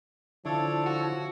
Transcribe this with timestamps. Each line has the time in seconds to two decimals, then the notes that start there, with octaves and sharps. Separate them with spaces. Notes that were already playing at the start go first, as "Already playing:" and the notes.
0.46 D3 F3 D4 E4 A4 C#5
0.86 F#4